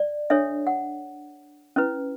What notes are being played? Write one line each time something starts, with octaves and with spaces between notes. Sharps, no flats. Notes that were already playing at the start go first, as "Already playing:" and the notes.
Already playing: D5
D4 A4 C#5 E5
F#5
C#4 E4 B4